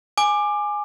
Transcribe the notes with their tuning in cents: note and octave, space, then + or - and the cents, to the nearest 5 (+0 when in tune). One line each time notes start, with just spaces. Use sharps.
G#5 +0 D6 +20